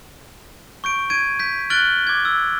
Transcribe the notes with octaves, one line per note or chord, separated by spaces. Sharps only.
C#6 G6 D7
G#6 D7 D#7
G6 B6
F6 F#6 A6 D7 F#7 G7
D6 G#6
E6